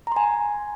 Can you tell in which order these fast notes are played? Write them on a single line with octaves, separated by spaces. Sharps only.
A#5 C6 G#5